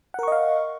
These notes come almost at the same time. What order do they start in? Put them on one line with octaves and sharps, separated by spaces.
F#5 A#4 C#6 D#5 F5